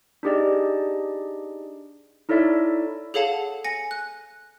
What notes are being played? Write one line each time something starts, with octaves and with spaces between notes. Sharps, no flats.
D4 D#4 G4 G#4 D5 D#5
D#4 E4 A4 C#5 D5 E5
G#4 A4 C#5 F5 F#5 A5
G#5 A#6 C#7
F#6